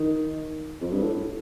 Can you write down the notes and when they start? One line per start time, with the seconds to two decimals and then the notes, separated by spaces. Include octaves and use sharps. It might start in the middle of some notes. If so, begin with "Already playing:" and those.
Already playing: D#3
0.81 F2
0.91 G2
1.02 A2